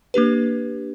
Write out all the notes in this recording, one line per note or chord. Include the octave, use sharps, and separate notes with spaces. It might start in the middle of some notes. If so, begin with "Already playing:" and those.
A#3 D4 G4 B4